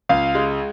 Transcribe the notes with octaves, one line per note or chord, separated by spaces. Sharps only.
C#2 F5
G#3